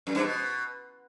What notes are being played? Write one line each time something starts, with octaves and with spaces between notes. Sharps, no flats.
F#2
G2
B2